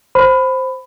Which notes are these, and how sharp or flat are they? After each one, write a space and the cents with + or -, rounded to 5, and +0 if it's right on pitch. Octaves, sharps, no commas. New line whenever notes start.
C5 +0 B5 +15